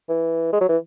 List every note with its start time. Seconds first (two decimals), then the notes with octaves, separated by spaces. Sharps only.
0.09 E3
0.53 G#3
0.61 F#3
0.69 E3